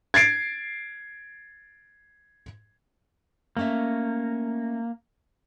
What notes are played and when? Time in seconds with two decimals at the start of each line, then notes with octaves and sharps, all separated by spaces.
0.14 G#6 A6 C7 D7
3.57 A3 A#3 C#4 E5